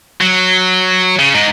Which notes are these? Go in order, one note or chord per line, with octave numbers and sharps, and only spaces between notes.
F#3
C#3
G#2 D#4